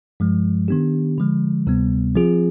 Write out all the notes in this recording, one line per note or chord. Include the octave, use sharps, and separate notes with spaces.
G2 F3 G#3
D#3 B3 D4 G4
D3 F3 G#3
D2 C3 G3 B3
F3 C4 F4 G#4